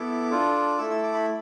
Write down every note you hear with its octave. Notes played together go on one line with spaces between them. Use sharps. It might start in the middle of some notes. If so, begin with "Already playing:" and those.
Already playing: B3 E4 A4 D6
D4 F4 A4
A3 E4 A4 E6
E6
D6
B5